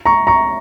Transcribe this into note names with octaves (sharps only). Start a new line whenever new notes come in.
A#5 C#6
A#5 C#6